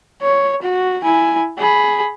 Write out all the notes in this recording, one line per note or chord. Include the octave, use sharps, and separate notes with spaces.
C#5
F#4
E4 G#5
G#4 B5